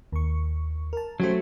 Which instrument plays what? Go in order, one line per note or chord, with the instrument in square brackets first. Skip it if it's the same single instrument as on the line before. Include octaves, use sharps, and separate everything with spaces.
[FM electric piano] D#2 C#6
A#4 A5
[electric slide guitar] F#3 A3 [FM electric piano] C#4 G4 C5